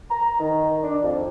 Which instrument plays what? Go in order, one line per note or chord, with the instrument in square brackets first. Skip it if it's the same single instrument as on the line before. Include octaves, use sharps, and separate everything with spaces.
[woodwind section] A#5
D#3
D4
F2